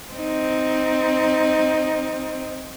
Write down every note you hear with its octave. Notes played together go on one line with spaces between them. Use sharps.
C4 D#4